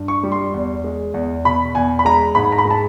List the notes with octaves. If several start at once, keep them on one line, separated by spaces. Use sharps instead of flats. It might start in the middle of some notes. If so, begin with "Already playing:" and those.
Already playing: G2
C#6
G3
C6
E2
G#3
E2
B2 B5
E2 G#5
B5
G#3 A#5
G#2 B5
A#5
B5
G#3
A5